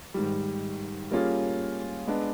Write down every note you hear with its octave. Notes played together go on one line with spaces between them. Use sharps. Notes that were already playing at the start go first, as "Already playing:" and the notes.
G#2 D#3 G3
G3 A#3 C#4 F4 G#4
G#3 B3 D4